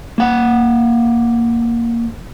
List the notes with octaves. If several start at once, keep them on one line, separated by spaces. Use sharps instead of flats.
A#3 F#5